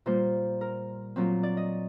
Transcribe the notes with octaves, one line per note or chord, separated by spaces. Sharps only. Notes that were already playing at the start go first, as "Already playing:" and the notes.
A#2 G3 A#3 C5
A#4
A#2 F#3 C4
D5
D#5